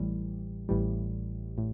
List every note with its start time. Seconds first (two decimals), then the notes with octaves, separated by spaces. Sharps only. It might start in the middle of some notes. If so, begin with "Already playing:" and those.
Already playing: A1 A2 E3 G3
0.69 A1 A2 E3 G3
1.58 A2